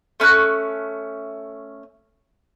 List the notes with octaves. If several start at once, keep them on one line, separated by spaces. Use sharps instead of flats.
A3 C#4 A#5 F#6